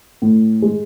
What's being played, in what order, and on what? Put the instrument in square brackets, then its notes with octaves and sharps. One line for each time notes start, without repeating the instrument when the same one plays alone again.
[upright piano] A2
G#3